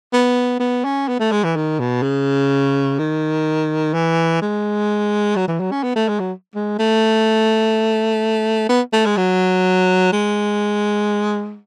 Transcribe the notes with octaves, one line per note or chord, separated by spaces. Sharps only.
B3
B3
C#4
B3
A3
G#3
E3
D#3
B2
C#3
D#3
E3
G#3
F#3
E3
F#3
C#4
B3
A3
G#3
F#3
G#3
A3
B3
A3
G#3
F#3
G#3